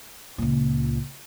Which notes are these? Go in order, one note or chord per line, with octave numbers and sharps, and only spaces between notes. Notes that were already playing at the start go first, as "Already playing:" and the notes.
C#2 A#2